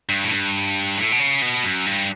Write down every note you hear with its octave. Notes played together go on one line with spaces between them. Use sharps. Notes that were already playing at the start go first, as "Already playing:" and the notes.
G2
A2
G2
A2
B2
C#3
B2
F#2
G2